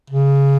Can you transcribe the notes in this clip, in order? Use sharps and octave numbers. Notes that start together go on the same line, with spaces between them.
C#3